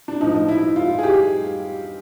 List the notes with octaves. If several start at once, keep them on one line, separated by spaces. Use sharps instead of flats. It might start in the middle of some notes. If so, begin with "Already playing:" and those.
D4
A2 F3 D#4
E4
F4
G#4
G4